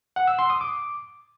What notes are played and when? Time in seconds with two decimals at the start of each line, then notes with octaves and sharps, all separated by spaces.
0.16 F#5
0.27 E6
0.39 C6
0.50 D#6
0.61 D6